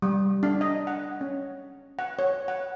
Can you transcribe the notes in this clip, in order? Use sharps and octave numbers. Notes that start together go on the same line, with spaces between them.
G3
D4
D#5
F#5
C#4
F#5
C#5
F#5